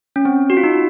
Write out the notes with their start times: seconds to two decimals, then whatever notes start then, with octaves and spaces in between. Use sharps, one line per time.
0.16 C#4
0.25 C4
0.50 F#4
0.57 F4
0.64 D#4